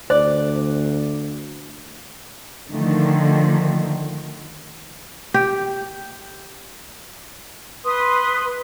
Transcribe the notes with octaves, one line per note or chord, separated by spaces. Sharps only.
D2 C5 D5
D3 D#3 F3 A3
G4
B4 C6 D#6